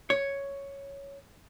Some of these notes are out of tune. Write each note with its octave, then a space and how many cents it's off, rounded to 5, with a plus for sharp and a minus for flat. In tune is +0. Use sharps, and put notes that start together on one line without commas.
C#5 +5